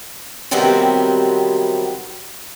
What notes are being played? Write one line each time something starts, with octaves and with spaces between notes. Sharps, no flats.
C3 D#3 F#3 G3 B3 C4